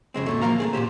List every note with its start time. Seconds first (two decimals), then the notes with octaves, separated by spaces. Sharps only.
0.14 F2 C#3 G#3 C4
0.26 D2 A#2 A3
0.41 F3 A#3 A#4 F5 A#5
0.60 A3 C4 G#4
0.73 A#2 C#3 G4 C5